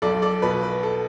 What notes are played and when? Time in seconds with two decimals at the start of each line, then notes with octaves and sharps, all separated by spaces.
0.02 B1 A4 D5
0.22 A4 D5
0.42 B2 B4
0.63 B4
0.83 A4